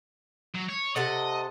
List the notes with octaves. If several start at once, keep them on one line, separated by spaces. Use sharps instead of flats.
F#3
C#5
C3 A4 D#5 F#5